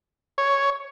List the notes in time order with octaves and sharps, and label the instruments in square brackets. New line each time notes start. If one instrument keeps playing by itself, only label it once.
[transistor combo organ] C#5